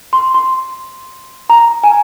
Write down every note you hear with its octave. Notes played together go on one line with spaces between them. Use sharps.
C6
C6
A#5
G#5